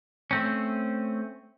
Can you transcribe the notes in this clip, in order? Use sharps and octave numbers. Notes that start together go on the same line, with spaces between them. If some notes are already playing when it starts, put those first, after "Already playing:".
A3 C4 C#4